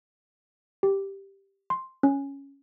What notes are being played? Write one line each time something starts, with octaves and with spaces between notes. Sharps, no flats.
G4
C6
C#4